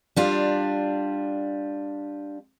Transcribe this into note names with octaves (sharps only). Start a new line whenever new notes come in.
G3 D4 F4